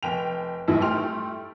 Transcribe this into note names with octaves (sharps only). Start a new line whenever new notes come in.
F1 G5 F7
G#1 F#2 A2 E3 E4
G3 A3 G5 C6 F6 F7